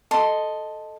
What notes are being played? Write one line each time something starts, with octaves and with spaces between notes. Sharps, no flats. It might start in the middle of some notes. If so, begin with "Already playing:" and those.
A4 D#5 C6